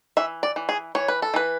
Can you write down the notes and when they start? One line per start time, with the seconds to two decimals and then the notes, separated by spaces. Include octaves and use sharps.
0.17 E3 E5
0.43 D5
0.56 E3
0.69 G#4
0.95 E3 C#5
1.08 B4
1.22 A4
1.34 E3 B4